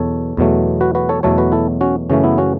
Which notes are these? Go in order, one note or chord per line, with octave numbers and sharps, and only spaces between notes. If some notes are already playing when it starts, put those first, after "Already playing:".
Already playing: E2 B2 F#3 A4 C#5
E2 B2 F#3 A3
F#4 B4
F#4 B4
A4 C#5
E2 B2 F#3 A3 A4 C#5
F#4 B4
E4 A4
C#4 F#4
F#2 C#3 E3 A3 C#4
B3 E4
C#4 F#4